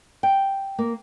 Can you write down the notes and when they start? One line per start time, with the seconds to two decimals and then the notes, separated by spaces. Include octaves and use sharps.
0.23 G5
0.79 A#3